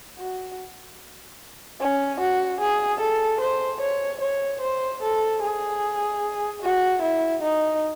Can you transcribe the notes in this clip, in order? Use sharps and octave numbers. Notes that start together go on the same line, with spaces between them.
F#4
C#4
F#4
G#4
A4
C5
C#5
C#5
C5
A4
G#4
F#4
E4
D#4